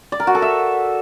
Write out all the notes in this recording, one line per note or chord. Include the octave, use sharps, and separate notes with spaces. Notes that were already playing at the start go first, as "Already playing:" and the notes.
D5
A#4
F#4
A4
E5